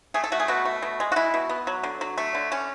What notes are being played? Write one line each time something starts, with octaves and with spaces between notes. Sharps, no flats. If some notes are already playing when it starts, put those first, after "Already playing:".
A3 G#4
A4
A3 F#4
G#4
B2 F#4
A3
B2
G#3
F#4
G#3 E4
B2
B3
F#3
D3
F#3
A3
D3
D3 C#4